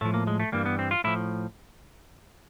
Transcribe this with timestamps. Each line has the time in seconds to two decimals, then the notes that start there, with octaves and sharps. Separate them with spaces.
0.01 A2 F3 A3
0.14 A#3
0.27 G#3
0.40 A3
0.52 G2 E3 G3 A#3
0.66 B3
0.79 C4
0.91 F4
1.04 A2 F3 E4